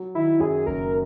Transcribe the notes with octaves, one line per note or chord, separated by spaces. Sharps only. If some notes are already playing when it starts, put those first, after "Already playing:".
Already playing: F#3
D#3 E4
F#2 G#4
F#1 A#4